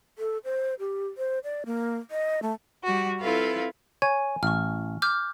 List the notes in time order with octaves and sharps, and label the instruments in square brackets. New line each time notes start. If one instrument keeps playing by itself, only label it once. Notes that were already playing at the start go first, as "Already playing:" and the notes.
[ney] A4
C5
G4
C5
D5
A#3
D#5
A3
[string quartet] G3 F#4
C4 E4 F4 A4 B4 F5
[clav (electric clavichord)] C#5 [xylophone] G#5
[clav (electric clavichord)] A1 [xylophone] C#6 F6
[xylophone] D6 F6 G6